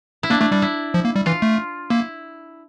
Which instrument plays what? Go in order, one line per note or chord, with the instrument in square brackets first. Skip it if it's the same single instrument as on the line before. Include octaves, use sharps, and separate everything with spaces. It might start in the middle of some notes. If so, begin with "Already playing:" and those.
[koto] E4
[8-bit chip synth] A#3 [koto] D4
[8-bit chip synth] A3 [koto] D4
[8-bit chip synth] G3 [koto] D4
[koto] E4
[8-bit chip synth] F3
A#3
G3
[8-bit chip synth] E3 [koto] F4
[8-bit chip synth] A3
[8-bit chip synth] A#3 [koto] E4